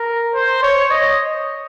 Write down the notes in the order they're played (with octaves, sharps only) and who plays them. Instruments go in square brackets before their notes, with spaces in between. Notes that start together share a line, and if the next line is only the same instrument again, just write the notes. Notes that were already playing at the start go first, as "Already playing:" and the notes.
Already playing: [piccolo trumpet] A#4
C5
C#5
D#5